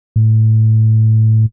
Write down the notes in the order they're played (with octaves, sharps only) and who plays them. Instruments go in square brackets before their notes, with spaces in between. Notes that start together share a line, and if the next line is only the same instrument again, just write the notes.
[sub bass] A2